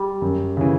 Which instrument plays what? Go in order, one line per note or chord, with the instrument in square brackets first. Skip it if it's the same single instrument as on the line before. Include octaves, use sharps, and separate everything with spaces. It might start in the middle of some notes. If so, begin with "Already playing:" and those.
Already playing: [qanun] G3
[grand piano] F#2
C#3 E3